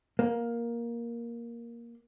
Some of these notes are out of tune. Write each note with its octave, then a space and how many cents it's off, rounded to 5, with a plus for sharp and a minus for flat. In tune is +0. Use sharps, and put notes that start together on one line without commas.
A#3 +10